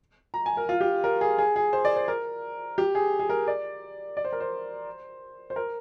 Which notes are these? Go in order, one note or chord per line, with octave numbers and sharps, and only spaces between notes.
A#5
G#5
A#4
F4
G4
A#4
G#4
G#4
G#4
C5
D5
C5
A#4
G4
G#4
G#4
A#4
D5
D5
C5
A#4
C5
C5
A#4